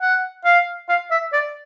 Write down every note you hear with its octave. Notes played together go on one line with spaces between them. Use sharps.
F#5
F5
F5
E5
D5